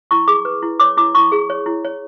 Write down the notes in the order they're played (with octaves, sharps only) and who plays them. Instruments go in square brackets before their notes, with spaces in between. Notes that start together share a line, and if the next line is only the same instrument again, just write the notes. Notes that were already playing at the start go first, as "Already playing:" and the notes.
[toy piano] E4 C#6
G#4 D6
B4
E4
C#5 D6
E4 D6
E4 C#6
G#4
C#5
E4
C#5